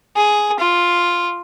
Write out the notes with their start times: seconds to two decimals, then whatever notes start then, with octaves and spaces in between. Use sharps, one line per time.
0.16 G#4
0.60 F4